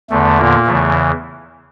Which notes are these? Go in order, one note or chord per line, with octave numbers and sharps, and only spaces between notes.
E2 D3 A3
A#2 A#3
E2 C#3 E3 A3